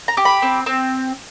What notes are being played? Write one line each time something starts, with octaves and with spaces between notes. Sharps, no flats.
A#5
G4
B5
C4
C4